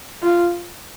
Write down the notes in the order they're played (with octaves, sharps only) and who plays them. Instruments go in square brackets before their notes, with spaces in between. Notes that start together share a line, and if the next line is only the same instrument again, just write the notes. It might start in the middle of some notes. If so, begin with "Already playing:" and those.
[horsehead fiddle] F4